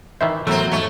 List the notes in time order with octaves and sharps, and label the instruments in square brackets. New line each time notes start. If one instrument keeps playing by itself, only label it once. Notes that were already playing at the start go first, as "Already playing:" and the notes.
[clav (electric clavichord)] D#3 E3 C5 [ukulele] E5
[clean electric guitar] E2 F#3 [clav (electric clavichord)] A2 A3 [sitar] C4 A#4
[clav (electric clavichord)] G#2 C#5 [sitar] A3